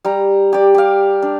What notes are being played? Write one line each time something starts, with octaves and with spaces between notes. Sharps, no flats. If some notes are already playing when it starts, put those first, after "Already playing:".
G3 A#5
G4 D5
G4 F5
D4